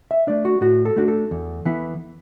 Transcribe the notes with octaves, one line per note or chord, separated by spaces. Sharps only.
E5
A3 D4 D5
F#4
A2 F#4
A4
A3 D4 F#4
A4
E2
E3 B3 E4